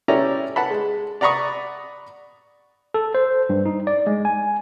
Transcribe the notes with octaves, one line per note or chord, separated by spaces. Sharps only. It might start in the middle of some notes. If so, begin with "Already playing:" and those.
C#4 E4 G4 D5 E5 A#5
F#5 A5 B5
G#3
D5 F#5 A#5 B5 C#6 D#6
A4
C5
G2
D#4
D5
G#3
G#5